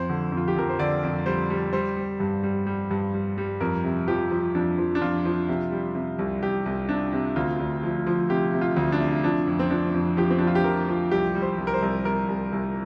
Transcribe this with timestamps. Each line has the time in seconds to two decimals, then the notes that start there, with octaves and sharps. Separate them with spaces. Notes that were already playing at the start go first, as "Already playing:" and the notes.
Already playing: F2 C5
0.09 D3
0.32 F2
0.37 F4
0.48 G4
0.56 F2 A#4
0.69 C5
0.79 D3 D5
1.03 F2
1.26 G3 C5
1.50 G3
1.73 G3 C5
1.96 G3
2.20 G2
2.43 G3
2.67 G3
2.91 G2
3.14 G3
3.38 G3
3.60 F2 A#4
3.84 C3
4.08 F3 G4
4.31 F3
4.55 F2 D4
4.78 F3
4.95 D4
5.01 F2 F4
5.25 F3
5.48 C3
5.72 G3
5.95 C3
6.19 C2
6.42 C2 G4
6.66 C2
6.89 C3 D4
7.13 C3
7.36 D2 F4
7.59 D2
7.83 F3
8.06 F3
8.30 C3 G4
8.53 C3
8.61 F4
8.76 D2
8.92 D4
9.00 C3
9.24 F3 D4
9.47 F2
9.59 C4
9.70 F3 D4
9.94 F2
10.17 F3 G4
10.30 C4
10.38 F3 D4
10.47 F4
10.55 G4
10.64 F3 A#4
10.88 F3
11.11 C2 G4
11.35 G3
11.42 C5
11.58 C2
11.67 A#4
11.74 C5
11.82 C2
12.04 C2 A#4
12.28 C2
12.52 C2